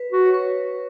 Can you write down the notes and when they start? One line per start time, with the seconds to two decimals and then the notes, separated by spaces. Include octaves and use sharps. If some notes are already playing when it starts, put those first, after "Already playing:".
Already playing: B4
0.12 F#4
0.26 C#5
0.34 B4